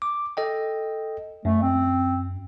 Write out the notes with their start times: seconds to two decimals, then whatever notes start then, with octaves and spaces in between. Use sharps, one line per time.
0.02 D6
0.37 A4 D#5 G5
1.45 F#2 A3
1.62 C4